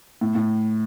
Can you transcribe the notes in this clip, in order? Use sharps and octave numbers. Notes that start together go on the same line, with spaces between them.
A2
A2